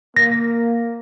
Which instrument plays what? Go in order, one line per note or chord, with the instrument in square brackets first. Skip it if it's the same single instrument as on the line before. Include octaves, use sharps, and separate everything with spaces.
[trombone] A#3 [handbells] A#6